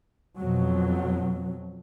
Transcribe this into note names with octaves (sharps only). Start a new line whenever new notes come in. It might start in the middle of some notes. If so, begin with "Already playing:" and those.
F2 B2 F#3